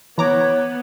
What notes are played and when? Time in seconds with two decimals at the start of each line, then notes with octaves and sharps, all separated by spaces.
0.18 E3 B3 C#5 A#5 D6